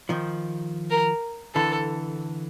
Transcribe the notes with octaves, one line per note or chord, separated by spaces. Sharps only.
D#3 F3
A#4
D3 E3 A4